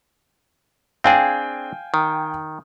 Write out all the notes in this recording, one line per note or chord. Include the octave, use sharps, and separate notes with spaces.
C4 D4 G#4 F5 G5 G#5
D#3